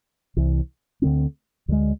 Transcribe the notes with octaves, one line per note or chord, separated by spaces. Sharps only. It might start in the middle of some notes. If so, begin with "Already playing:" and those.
C2 C3 E3
D2 D3 G#3 C4
D2 D3 F3 G#3